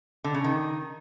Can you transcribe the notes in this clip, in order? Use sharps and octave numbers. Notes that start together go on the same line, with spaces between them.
D3
C#3
D#3